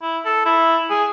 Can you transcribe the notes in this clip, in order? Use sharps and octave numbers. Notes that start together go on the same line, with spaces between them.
E4
A4
E4
G#4